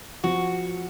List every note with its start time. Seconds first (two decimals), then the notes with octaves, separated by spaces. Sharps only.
0.24 F3 F#4